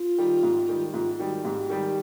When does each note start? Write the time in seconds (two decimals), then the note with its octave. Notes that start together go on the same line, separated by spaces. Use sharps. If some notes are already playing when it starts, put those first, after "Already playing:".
Already playing: F4
0.18 D#3 G3
0.43 G#2
0.69 D#3 G3
0.93 G#2 F4
1.14 F4
1.19 D#3 G3 F#4
1.45 G#2 G4
1.70 D#3 G3